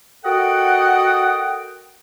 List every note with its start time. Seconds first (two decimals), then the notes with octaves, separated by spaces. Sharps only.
0.25 F#4 A4 A#4 D#5 F#5 G5